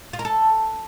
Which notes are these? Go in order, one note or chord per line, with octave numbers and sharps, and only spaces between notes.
F4
A#4
A4